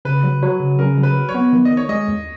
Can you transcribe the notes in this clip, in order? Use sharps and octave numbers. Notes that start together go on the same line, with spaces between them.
C#3 B4
F#3
F#3
C#3
C#3 A#4
F#3
B4
F#3
C#5
B3
D#3
D#5
D#3
C#5
G#3 D#5
D#2